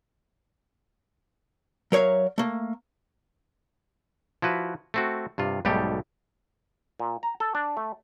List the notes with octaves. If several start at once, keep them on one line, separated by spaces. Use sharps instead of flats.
F#3 A#4 C#5 E5 F5
A3 A#3
F3 E4 F#4 B4
A3 C4 F#4
G2 C3 F4
B1 G#2 B2 G3 A3 G4
A#2
A#5
A4
D4
A3